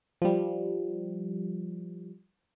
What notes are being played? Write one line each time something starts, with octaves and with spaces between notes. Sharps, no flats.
F3 G3